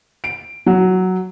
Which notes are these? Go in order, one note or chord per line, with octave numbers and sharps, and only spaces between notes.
D7
F#3